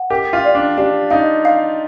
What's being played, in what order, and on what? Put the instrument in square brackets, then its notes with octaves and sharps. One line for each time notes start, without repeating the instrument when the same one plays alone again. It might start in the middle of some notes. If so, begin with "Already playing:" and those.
Already playing: [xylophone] F#5
[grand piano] G4 [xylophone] A#4
[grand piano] F4
[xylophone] D5
[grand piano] D4
[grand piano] D4 [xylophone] G4
[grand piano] D#4 [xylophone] F5
[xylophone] F5